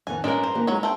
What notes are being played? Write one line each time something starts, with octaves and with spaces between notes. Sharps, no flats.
F2 D#3 B3 G#5
G2 G#3 A#3 C#4 D4 A#4
C5
E3 A#3 G4
F#3 G#3 B3 D#4 C#5
A3 C5 G5